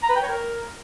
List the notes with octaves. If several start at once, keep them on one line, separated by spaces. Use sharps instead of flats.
A#5
B4
G5
C#5
A#4